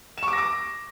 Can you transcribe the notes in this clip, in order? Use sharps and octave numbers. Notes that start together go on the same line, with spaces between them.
E7
C#6
D6
A#6
D6